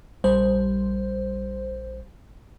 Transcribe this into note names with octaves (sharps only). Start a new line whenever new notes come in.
A#1 G3 C5